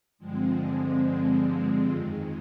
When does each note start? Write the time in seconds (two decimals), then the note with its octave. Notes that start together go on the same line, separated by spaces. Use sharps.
0.19 G2 D3 F3 G#3 C4
1.05 G#3
1.47 G#3
1.90 F2 D#3 G#3